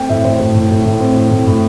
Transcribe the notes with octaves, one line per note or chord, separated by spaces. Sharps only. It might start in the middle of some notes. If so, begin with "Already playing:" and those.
Already playing: A3 C4 G5
A2 E5
A2 C5
A2 A4
A2
A2
A2
C4
A2
A2
A2